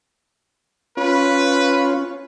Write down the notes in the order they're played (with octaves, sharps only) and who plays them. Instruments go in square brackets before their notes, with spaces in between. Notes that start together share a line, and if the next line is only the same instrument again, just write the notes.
[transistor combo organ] C#4 F4 [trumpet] B4